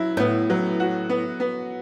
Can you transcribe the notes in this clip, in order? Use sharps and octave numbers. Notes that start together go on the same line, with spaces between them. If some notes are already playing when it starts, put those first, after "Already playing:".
Already playing: F#3 E4
A2 B3
F#3
F#4
B3
B3